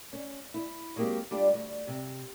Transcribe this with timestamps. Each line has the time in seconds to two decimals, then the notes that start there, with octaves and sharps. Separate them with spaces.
0.13 C#4
0.54 E4
0.96 F#3 G#3 A#3 C4 G4
1.31 G3 D4 F4 G4
1.53 D2
1.87 C3